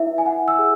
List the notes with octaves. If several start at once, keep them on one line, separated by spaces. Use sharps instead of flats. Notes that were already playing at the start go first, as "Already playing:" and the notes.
Already playing: E4 B4 E5
G#5
E4 F#5
E6
G#4